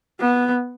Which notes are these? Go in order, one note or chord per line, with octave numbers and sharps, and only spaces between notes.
B3